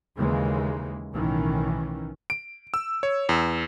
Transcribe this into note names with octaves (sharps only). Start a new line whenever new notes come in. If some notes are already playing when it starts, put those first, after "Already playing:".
D#2 C#3 E3 G#3 A#3
B1 A2 D#3 E3 C#4
D7
E6
C#5
E2